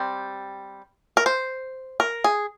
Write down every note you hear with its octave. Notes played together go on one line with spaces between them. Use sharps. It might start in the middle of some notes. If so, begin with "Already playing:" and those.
Already playing: G3 C4
A#4
C5
A#4
G#4